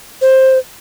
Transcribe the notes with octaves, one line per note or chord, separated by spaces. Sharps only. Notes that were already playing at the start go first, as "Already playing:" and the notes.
C5